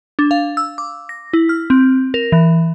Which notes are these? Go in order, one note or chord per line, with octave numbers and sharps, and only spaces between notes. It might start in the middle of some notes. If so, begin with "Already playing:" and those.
D4
F5
E6
D6
A#6
E4
F6
C4
A#4
E3